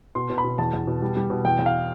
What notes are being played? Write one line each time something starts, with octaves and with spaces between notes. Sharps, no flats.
B2 C6
B2
B5
B2
E2 A5
E2
B2
G3
G3
B2
E2 G5
E2
F5